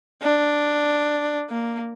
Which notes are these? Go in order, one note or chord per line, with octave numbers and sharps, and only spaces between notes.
D4
A#3